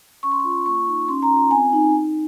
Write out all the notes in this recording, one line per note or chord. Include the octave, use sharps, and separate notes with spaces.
C#4 C#6
C6
C#6
F4
A#3 C#6
D#4
C#4 C6
A#5
F4
A#5
C4 G#5
D#4
D#4